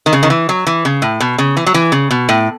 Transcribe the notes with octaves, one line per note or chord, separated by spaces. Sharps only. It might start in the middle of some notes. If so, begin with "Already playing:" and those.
D#3
C#3
D#3
E3
F#3
E3
C#3
A2
B2
C#3
E3
F#3
E3
C#3
B2
A2